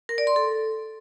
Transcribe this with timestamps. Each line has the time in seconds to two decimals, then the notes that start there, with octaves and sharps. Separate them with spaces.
0.09 A#4
0.18 D5
0.27 C6
0.36 A4